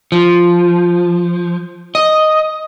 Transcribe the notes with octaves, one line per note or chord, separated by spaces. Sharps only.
F3
D#5